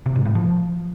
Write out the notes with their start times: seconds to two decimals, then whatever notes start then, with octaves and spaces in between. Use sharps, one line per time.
0.06 C3
0.16 G#2
0.25 A2
0.35 F3